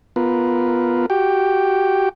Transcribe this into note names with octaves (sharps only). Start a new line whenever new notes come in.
B3 F4 A#4 B4
F#4 G4 G5